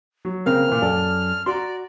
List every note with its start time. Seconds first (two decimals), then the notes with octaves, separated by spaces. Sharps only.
0.25 F#3
0.46 C#3 A#3 C4 F6
0.68 A#2 E3
0.82 F#2 A4 D5 A5
1.46 F#4 D5 A#5 C6